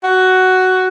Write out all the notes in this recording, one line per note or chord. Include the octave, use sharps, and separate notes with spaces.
F#4